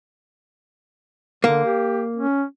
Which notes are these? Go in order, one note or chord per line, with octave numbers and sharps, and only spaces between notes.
D3 A#3
G4
C#4